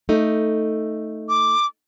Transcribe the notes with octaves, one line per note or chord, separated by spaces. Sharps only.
A3 D#4
D6